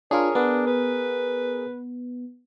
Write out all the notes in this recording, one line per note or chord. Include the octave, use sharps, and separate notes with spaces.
D4 F4 G#4 A#4 C#5
B3 D4
B4